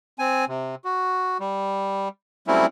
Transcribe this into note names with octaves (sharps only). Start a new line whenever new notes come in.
C4 G#5
C3
F#4
G3
F#3 G3 A3 C4 C#4 E4